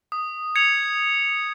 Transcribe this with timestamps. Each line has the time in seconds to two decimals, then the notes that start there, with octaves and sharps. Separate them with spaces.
0.12 D#6
0.56 G#6 C#7 F7
0.99 D#6